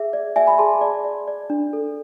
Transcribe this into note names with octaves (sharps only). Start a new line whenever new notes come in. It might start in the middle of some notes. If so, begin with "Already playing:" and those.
Already playing: G#4 E5
D5
D5 E5 G#5
G#5 B5
G#4 A5 C6
D5
D5
D5
D4
A4